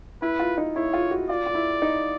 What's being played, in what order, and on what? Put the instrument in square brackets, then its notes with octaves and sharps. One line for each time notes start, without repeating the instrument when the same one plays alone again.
[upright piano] E4 [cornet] B4
[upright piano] F4
D#4
[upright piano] E4 [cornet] C#5
[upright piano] F4
F#4
[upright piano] F4 [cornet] D5
[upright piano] F4
E4
D#4